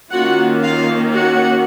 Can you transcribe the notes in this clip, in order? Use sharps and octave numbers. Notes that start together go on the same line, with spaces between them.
D#3 A#3 C#4 F4 F#4 F#5
F4 F5
F#4 F#5